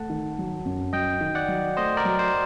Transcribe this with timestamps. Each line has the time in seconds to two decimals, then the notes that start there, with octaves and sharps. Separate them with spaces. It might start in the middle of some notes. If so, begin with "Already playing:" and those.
Already playing: A3 F#5 A5
0.10 D#3
0.38 F#3
0.65 F#2
0.93 F#3 D#5 G5
1.21 D#3
1.35 D5 F#5
1.48 F#3
1.77 A3 C5 D#5
1.97 A#4 D5
2.05 F#3
2.19 C5